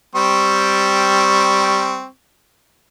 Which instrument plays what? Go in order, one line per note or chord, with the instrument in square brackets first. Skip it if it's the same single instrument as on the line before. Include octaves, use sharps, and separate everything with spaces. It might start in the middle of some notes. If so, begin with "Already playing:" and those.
[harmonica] G3 C4 C#6